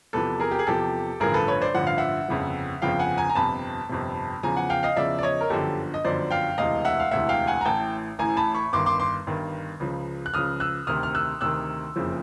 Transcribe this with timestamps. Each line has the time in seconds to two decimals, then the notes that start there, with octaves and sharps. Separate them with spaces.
0.13 E2 C3 F3 A4 B4
0.40 G#4 A#4
0.51 G4
0.59 G#4
0.67 E2 C3 F3 G4 A4
1.20 A1 G2 D3 F3 G#4 A#4
1.34 A4 B4
1.48 B4 C#5
1.62 C5 D5
1.74 A1 G2 D3 F3 F#5
1.87 F5
1.98 E5 F#5
2.28 G1 F2 C#3 F3
2.82 G1 F2 C#3 F3 F5 G5
2.99 F#5 G#5
3.17 G#5 A#5
3.30 A#5
3.35 G1 F2 C3 A5 B5
3.89 G1 F2 C3
4.43 E2 C#3 F3 G#5 A#5
4.57 F#5 G#5
4.70 F5 G5
4.83 D#5 F5
4.97 E2 C#3 F3 D5 E5
5.19 D5
5.23 C#5 D#5
5.41 A#4
5.50 G1 F#2 D3 F3 G4 A4
5.94 D#5
6.04 G1 F#2 D3 F3 C5 D5
6.31 F5 G5
6.58 E1 D2 C3 E3 D#5 F5
6.85 E5 F#5
7.00 F5
7.11 E1 D2 C3 E3 E5 F#5
7.29 F5 G5
7.47 F#5 G#5
7.61 A#5
7.65 A1 A2 E3 G5 A5
8.19 A1 A2 E3 G#5 A#5
8.37 A5 B5
8.54 B5 C#6
8.73 G1 G2 D#3 C6 D6
8.86 C6 D6
9.00 C6 D6
9.27 G1 G2 D#3
9.80 C#2 C#3 F3
10.26 F#6
10.34 C#2 C#3 F3 D#6 F6
10.60 E6 F#6
10.87 D2 C3 D#3 D#6 F6
11.03 F6
11.15 E6 F#6
11.41 D2 C3 D#3 E6 F#6
11.96 F#1 F2 C#3 F3